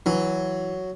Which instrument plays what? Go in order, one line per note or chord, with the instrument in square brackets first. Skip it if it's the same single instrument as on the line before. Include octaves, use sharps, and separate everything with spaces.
[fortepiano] E3 [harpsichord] F#3